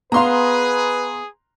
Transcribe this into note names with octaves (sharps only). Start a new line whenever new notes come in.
B3 G#4 B4 F5 A#5 C6